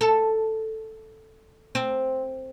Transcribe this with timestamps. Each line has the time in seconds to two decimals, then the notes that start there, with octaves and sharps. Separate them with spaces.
0.01 A4
1.75 C4